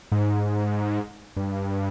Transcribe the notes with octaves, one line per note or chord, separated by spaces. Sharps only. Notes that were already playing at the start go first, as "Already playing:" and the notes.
G#2
G2